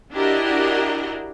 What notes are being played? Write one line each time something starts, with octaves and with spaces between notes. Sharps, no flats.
D4 E4 F#4 G4 A#4 D#5